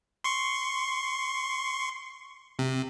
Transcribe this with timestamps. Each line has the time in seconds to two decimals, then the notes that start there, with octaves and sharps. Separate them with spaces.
0.24 C6 C#6
2.59 C3